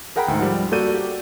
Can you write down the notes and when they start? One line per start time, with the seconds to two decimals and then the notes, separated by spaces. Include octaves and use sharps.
0.16 G#4 A#4 F#5 G5 A#5 B5
0.28 D2 G#2
0.40 F3 G3
0.72 A#3 F#4 A4 D5 G6 D#7
0.94 G4